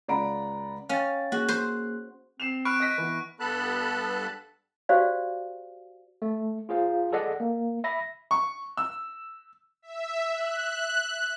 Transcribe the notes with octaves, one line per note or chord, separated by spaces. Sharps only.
C#2 D5 F#5 A#5 B5 D7
C#4 F5 G5 A6
A#3 F#4 G#4 F#6
C5
C4 C7 E7 F7
B5 C#6 F6 F#6 D7
D#5 A#6 B6
E3 B3
G2 B3 A4 A5 B5 F#6
F#4 G4 C5 D5 F5
A3
F4 G#4 C5 F5
G#4 A4 D5 D#5 F#5
A#3
E5 B5 A#6
C#6
E6
E5
F#6